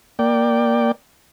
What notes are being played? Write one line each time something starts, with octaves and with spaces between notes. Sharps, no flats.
A#3 D5 G5